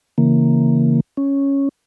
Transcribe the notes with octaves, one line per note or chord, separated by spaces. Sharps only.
C#3 E3 A#3
C#4